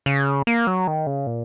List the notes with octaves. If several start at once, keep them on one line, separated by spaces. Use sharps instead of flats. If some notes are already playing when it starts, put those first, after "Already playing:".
C#3
A#3
F#3
D#3
C#3
A#2